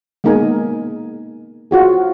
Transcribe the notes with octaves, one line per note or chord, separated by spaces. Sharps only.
G#3 A#3 B3 D#4 A#4 G#5
F4 F#4 G#4